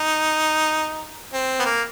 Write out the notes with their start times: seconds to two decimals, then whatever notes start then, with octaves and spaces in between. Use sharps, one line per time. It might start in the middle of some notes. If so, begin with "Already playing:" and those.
Already playing: D#4
1.34 C4
1.60 B3
1.65 A#3